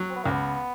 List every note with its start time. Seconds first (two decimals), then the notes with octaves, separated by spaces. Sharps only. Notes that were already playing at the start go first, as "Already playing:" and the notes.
Already playing: F#3
0.10 C4
0.16 B3
0.23 C#2 A#3
0.31 B3